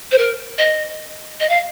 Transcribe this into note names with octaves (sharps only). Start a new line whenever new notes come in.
C5
A#4
D#5
D#5
F5